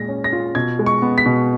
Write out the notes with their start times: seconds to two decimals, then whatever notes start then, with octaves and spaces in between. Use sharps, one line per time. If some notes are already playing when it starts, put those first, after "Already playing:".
Already playing: A#2 G#3 A#6
0.08 C#4
0.24 A#6
0.33 F4
0.55 B2 G#6
0.79 G#3
0.86 C#6
1.02 B3
1.18 B6
1.26 B2